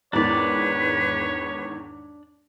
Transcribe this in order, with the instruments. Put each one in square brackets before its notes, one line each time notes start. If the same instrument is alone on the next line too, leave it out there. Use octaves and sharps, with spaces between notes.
[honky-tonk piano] E2 G#2 D#3 [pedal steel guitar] D4 D5 [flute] B4 [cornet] C#5